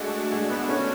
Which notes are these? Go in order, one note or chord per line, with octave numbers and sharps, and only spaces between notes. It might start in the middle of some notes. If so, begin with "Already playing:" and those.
Already playing: G#3 A3 D4 F#4
G#3
B3
C#4